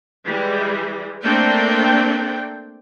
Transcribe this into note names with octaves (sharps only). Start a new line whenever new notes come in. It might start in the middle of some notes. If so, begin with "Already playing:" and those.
E3 G3 G#3
A3 A#3 C4 D4 A4 G5